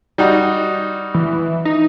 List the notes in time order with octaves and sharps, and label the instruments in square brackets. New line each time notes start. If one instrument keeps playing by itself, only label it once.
[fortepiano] G3 D#4 F#4
[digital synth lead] E3
D#4